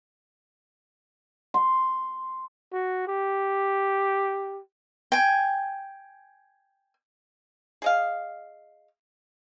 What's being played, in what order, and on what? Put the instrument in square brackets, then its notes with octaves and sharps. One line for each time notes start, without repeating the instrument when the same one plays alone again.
[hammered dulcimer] C6
[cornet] F#4
G4
[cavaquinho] G5 G#5
[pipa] G#4 D#5 F5